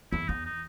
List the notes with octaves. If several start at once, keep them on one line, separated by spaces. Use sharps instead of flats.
E2 E4
E2 D#4
D#4